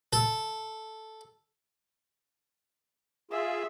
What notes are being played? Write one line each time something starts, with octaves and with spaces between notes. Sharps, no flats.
A4
F4 G#4 E5